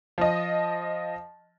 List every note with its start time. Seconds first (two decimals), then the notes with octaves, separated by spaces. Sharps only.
0.18 F3 D#5